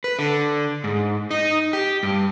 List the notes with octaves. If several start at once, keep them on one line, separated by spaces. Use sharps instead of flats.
B4
D3
G#2
D#4
G4
G2